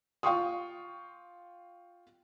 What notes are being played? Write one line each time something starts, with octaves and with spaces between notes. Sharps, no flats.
F4 F5 G5 C6 C#6 D#6